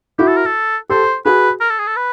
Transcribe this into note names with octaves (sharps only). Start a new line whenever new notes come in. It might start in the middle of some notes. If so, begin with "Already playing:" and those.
E4 F#4 G4
A4
A#4
A4
G4 A4 C5
F#4 G#4 B4
A#4
A4
G#4
A4
B4